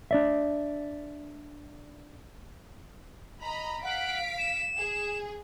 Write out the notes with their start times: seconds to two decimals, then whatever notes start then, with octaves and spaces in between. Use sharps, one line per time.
0.11 D4 D5 E5
3.42 D#5 A#5 B5
3.83 F5 F#5 B6 D7
4.39 E7
4.78 G#4